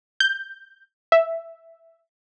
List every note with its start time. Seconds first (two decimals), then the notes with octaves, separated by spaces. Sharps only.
0.20 G6
1.12 E5